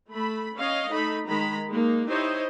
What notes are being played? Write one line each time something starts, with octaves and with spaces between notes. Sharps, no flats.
A3 B5
C#4 C#5 D#5 F5
A3 D#4 B5
D#3 G#3 A#5 B5
G#3 A#3 D#4
D#4 E4 G4 C5 C#5 D#5